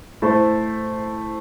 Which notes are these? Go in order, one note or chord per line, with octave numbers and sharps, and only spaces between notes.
A3 E4 A4 C5